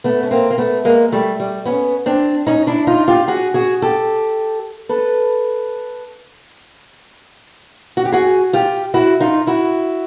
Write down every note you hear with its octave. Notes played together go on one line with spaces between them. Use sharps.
A3 B3
C#4
A#3 C4
A#3
A3 B3
G#3 A#3
G3 A3
G3
B3 C#4
C4 D4
C#4 D#4
D4 E4
D#4 F4
F4 G4
F#4 G#4
F#4 G#4
G4 A4
A4 B4
F#4
G4
F#4 G#4
F4 G4
E4 F#4
D#4 F4
E4 F#4